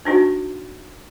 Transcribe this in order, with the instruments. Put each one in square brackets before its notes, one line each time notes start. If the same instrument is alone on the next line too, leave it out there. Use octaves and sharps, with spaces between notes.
[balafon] D4 D#4 F#4